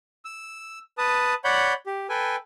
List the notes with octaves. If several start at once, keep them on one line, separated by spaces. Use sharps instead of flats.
E6
B4 A5 D#6
C#5 D5 F#5 B5 G6
G4
A4 B4 G5 G#5